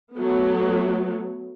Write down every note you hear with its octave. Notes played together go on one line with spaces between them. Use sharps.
F#3 A3 B3